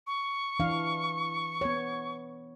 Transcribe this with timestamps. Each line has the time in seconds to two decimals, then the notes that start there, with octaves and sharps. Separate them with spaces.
0.07 C#6
0.59 E3 D4 F5
1.61 B3 C#5